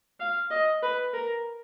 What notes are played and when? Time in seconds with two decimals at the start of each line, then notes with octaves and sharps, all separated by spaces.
0.20 F5
0.51 D#5
0.82 B4
1.13 A#4